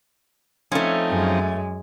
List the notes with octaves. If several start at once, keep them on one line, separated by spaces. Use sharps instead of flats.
F3 A3 C4 C#4 D#4
F#2 G#3